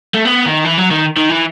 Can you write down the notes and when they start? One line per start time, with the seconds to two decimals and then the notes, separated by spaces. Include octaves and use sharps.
0.14 A3
0.25 B3
0.46 D#3
0.65 E3
0.77 F#3
0.91 D#3
1.17 D#3
1.30 E3